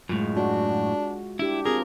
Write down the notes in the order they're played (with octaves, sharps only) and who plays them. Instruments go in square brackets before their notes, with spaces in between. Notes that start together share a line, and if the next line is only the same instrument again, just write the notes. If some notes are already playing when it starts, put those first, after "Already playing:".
[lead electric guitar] F#2 A2 [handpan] G#3 F4
[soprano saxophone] D4 [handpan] F#4
[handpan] D4 G4 [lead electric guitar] E4
[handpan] C4 F4 [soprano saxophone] G#4 [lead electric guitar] A#4